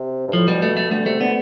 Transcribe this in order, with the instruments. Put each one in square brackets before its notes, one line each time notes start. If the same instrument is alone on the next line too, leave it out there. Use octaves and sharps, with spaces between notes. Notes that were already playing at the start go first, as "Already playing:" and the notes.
Already playing: [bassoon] C3
G2
[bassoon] A2 [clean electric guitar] F3
[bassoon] B2 [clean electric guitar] G3
[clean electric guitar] A3
A3
[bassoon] D3 [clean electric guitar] G3
[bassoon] C3 [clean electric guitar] A3
[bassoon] D3 [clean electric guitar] B3